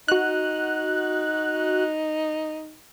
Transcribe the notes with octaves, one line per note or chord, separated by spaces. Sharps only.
D#4 F#4 F#6